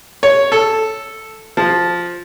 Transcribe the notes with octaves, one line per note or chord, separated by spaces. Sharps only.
C#5
A4
F3